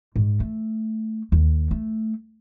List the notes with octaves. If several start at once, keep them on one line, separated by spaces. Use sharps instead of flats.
G#2
A3
D#2
A3